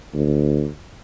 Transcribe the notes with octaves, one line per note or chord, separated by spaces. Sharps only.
D2